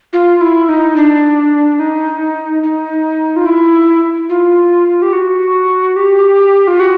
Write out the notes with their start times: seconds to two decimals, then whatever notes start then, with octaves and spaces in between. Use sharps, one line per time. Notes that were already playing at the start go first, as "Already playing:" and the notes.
0.13 F4
0.41 E4
0.69 D#4
0.96 D4
1.79 D#4
2.63 D#4
3.36 F4
3.46 E4
4.29 F4
5.02 G4
5.13 F#4
5.96 G4
6.67 F4
6.80 F#4